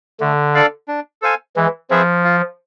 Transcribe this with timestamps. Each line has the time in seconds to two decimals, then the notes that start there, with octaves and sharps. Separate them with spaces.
0.20 D3 A3
0.55 D4 A4 D5 F5
0.88 D4
1.22 A4 C5 F5 G#5
1.56 E3 G#3
1.90 F3 C4 G#4 B4 E5
2.24 F4